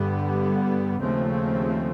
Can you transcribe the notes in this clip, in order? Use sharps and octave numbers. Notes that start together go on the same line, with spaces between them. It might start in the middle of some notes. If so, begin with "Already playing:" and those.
Already playing: G2 D3 G3 B3
D#2 C#3 F3 A3 C4